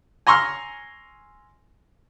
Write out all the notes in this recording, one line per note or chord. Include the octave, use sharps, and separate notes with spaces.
G#5 A#5 C6 C#6 E6 F6